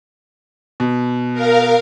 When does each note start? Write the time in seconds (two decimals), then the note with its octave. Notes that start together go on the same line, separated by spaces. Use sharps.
0.80 B2
1.33 A#4 F5